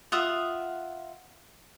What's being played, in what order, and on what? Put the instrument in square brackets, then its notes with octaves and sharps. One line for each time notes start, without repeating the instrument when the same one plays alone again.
[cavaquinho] F4 E5 F#5 D#6